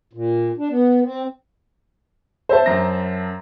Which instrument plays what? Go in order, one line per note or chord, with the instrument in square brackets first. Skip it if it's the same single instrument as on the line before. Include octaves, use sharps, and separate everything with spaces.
[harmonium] A#2
D4
B3
C4
[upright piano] C5 E5 A5
[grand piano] F#2 A#5 A#6